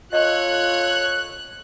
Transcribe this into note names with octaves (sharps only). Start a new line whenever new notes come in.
F4 A4 C#5 D#5 F#6